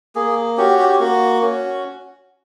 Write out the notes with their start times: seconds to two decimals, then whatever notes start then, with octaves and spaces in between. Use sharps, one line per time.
0.15 A#3 G#4
0.57 C#4 F#4 G4
0.79 G4
0.89 G4
0.99 A#3 F#4
1.42 C#4 F#4